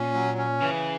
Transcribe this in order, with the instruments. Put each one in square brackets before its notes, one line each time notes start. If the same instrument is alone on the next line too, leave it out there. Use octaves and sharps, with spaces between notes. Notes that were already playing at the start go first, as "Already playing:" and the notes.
Already playing: [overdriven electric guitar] A#2 [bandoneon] C#4
[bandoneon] F#3
C#4
[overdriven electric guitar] C#3 [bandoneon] E3